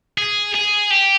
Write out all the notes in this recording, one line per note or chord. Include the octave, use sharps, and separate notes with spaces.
G#4
G#4
G4